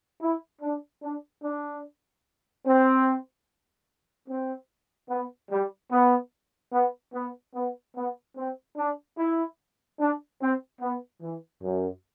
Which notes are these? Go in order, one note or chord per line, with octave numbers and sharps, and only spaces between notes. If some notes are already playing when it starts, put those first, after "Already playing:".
E4
D4
D4
D4
C4
C4
B3
G3
B3
B3
B3
B3
B3
C4
D4
E4
D4
C4
B3
E3
F#2